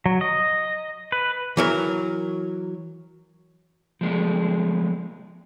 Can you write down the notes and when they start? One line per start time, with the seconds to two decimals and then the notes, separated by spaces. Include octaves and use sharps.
0.06 F#3
0.21 D#5
1.12 B4
1.57 E3 F#3 A#4
4.01 F3 G#3 A3